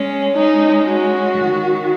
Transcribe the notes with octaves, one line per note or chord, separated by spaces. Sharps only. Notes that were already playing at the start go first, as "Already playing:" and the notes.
Already playing: G#3 C#4
G#3 C#4 D#4
F#4
D#3